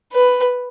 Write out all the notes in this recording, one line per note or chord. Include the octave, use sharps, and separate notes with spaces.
B4